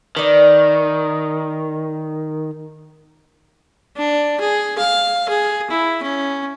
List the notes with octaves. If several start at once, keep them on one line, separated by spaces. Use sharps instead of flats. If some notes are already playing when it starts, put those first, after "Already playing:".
D#3 B4 D5
D4
G#4
F5
G#4
E4
C#4